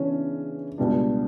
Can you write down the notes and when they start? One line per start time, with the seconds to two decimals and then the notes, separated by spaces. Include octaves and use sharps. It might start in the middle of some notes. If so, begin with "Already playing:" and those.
Already playing: C#3 E3 B3 C#4 D4
0.78 C#2 B2 G3 D4